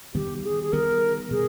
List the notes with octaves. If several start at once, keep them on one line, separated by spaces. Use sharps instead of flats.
D#3 G3 B3 G4
G#4
G#4
D#3 G3 B3 A#4
B2 G3 G#4